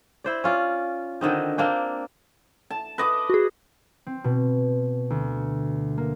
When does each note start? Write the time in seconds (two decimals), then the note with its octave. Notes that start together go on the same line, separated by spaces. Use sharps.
0.24 E4 C5 D5
0.44 C#4 F4 D5
1.21 D3 D#3 C4 D#4
1.58 A#3 C4 D4 G5
2.70 A5
2.98 B4 D#5 D6
3.29 F#4 G#4
4.07 C4
4.24 B2
5.10 D2
5.98 A#3